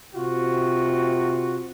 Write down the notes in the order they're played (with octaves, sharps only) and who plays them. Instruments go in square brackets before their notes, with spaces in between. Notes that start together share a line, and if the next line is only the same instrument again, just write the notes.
[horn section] C3 F4 F#4